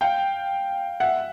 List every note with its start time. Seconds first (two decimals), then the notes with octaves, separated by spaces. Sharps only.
0.01 F5 G5
1.00 E5 F#5